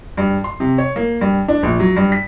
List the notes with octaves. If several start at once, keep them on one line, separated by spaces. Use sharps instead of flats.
G2
C6
C3
C#5
A#3
G2
D4
A#1
F#3
G2
B6